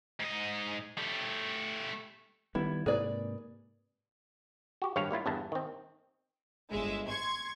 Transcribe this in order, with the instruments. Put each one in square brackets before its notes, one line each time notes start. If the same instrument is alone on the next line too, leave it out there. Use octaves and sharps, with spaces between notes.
[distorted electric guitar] G#2 D#5
A3 G4
[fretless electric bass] D#3 G3 B3 [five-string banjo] E4
[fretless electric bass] G#2 C3 A#3 [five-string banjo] G#4 B4 D5
[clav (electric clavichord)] F#4 G4
G#1 G2 C#5 F5
G3 A#3 E4 F4
G1 E2 G2 A5
D#3 C4
[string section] G1 G#3 E5
C6 C#6 G#6